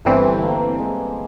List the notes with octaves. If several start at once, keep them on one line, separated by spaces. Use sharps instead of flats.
G1 G2 E3 G3 A3 C4
A#3
G#3